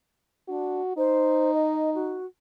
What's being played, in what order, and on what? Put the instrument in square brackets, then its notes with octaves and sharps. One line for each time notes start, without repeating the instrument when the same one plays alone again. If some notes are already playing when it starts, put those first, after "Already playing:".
[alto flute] D4 [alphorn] F#4
[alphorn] D#4 [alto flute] C5
[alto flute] D#5
F#4